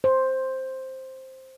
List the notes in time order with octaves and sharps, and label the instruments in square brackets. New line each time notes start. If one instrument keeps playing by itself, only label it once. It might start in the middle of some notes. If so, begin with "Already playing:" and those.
[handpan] C5